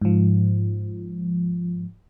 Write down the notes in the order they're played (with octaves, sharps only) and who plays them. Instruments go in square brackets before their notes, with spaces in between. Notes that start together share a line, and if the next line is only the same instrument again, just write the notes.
[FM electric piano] G#2 F3